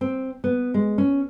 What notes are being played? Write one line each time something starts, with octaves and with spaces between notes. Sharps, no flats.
C4
B3
G#3
C#4